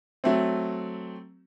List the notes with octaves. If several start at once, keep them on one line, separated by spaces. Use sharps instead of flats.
F#3 A3 C4